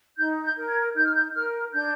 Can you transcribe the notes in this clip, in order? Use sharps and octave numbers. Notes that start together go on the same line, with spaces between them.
D#4 G6
G6
A#4
G#6
D#4 G6
F6
G6
A#4 F6
D4 G6